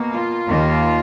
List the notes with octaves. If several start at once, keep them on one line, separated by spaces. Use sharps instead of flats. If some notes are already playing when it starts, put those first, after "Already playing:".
Already playing: B2 A#3
F4
D#2 D#3 A#3